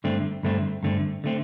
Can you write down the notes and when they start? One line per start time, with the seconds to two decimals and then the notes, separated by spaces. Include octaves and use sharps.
0.04 G2 D3 A3 C4
0.43 G2 D3 A3 C4
0.83 G2 D3 A3 C4
1.24 D3 A3 C4